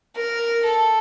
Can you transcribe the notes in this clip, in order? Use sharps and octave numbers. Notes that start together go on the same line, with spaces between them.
A#4
A4